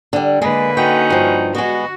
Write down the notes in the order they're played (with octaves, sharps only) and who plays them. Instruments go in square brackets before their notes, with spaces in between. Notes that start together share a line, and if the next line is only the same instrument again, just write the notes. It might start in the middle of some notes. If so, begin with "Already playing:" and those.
[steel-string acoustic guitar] D3 G3
[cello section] D3 A#3 B4 [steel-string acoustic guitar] G#3
[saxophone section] C#4 D#4 F#4 [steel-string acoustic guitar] G5
[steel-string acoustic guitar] G2 F3
[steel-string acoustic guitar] G#3 B3 [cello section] F#4